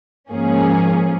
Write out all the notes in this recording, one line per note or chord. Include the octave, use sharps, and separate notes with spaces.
G#2 F3 A#3 C#4 G#4